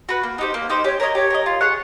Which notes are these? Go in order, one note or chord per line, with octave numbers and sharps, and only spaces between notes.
F#4 B4
A#3
D#4 G4 C5
A#3
D#4 G4 C5
G4 C#5
A#4 C#5 D#5
G4 C#5
A#4 D#5
F4
G#4 C#5 F#5